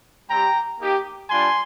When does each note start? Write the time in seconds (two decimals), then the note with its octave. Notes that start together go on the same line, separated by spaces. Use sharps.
0.29 G3 C4 G4 G5 A#5
0.79 A#3 D#4 G4
1.30 G3 D4 F4 G#5 C6